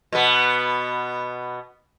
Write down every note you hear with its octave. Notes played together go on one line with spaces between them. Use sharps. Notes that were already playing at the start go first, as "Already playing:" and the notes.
B2 B3